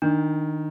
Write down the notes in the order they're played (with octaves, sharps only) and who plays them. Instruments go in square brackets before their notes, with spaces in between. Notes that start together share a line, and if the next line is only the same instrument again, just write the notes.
[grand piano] D#3 [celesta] D4